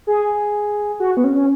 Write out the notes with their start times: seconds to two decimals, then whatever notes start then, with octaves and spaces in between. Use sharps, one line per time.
0.07 G#4
1.00 F#4
1.17 B3
1.24 C#4
1.35 C#4